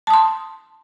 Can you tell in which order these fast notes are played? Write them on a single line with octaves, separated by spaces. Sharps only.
A5 D#6 C6